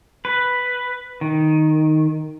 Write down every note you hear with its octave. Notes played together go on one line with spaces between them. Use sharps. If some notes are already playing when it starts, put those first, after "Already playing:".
B4
D#3